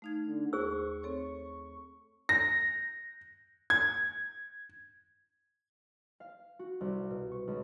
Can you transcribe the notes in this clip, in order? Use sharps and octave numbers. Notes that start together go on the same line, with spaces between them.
A3 D#4 F5 G#6
D3
D#2 G#4 C5 C#6 E6
C4 A4 C#5
A#6
G#6
F5
F#4
C2
B2
C#6
C#2